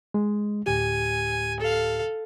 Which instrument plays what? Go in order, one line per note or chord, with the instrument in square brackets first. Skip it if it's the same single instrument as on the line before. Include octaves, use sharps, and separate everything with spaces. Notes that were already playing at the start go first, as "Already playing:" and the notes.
[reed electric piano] G#3
[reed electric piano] D2 A2 G4 [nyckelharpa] G#5
[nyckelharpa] A4 F5